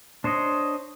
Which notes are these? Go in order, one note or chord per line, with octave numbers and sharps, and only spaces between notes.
D4 C5 C#5 D#5